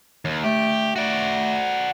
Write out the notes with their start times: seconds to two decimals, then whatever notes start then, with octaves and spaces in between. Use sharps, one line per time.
0.25 D#2
0.44 A3 G4
0.96 A3 F#4 D5